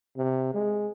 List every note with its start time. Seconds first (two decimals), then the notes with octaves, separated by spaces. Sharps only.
0.17 C3
0.54 G#3